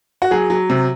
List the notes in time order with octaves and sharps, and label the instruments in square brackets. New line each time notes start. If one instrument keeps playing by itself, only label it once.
[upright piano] F#4
F#3 G#4
F#3
C3